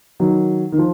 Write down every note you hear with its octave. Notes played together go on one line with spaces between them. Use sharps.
D#3 F#3
D#3
F3